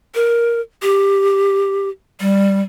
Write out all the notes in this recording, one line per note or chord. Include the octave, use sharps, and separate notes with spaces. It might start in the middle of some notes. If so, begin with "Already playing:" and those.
A#4
G4
G3